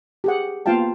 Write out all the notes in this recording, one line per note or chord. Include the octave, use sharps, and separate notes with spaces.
G4 G#4 F#5
A#3 B3 F4 F5 G5 A5